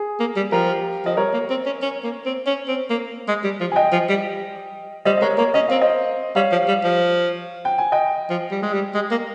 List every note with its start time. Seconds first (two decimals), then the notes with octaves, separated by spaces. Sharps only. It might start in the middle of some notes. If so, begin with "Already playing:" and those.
Already playing: G#4
0.20 A#3
0.36 G3
0.52 F3 G4 A#4
1.05 F3 D#5
1.17 G3 A#4 C#5
1.34 A#3
1.50 C4
1.66 C#4
1.82 C#4
2.04 A#3
2.26 C4
2.47 C#4
2.68 C4
2.90 A#3
3.28 G#3
3.44 G3
3.61 F3
3.72 G#5
3.76 D#5 G5
3.92 F3
4.09 G3
5.05 G3 C5 D#5
5.17 D#5
5.22 G#3 A#4 C#5
5.38 A#3 A#4 C#5
5.54 C#4 D#5
5.68 C4 F5
5.81 C5 D#5
6.35 G3 C#5 F5
6.52 F3
6.68 G3
6.84 F3
7.65 G5
7.78 G#5
7.92 D#5 G5
8.30 F3
8.51 G3
8.63 G#3
8.73 G3
8.95 G#3
9.11 A#3